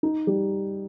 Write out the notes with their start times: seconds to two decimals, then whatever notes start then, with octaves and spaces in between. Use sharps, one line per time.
0.03 D#4
0.27 G3